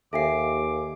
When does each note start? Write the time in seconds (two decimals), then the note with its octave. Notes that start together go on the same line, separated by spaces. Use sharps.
0.13 D#2 A4 E5 F5 G5 G#5 D6 C7